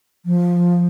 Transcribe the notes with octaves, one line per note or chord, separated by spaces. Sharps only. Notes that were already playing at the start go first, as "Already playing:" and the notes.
F3